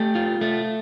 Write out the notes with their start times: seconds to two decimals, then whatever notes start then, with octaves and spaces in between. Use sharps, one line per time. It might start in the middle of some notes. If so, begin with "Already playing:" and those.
Already playing: A3 G4
0.15 F4
0.41 A3